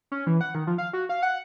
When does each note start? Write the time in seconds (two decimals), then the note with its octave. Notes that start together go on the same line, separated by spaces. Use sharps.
0.12 C#4
0.27 E3
0.41 F#5
0.55 D#3
0.67 F3
0.78 F5
0.93 F#4
1.09 F5
1.23 F#5